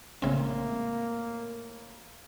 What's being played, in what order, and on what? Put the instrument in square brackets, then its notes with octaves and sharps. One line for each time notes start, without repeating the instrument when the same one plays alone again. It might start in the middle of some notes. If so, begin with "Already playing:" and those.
[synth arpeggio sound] A#1 G#3 E5 [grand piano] A2 [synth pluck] C#3 C4 [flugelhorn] A#3